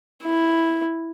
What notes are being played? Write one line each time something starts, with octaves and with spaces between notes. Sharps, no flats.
E4